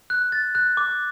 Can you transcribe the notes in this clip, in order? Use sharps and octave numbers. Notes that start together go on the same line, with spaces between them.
F#6
A6
F#6
D6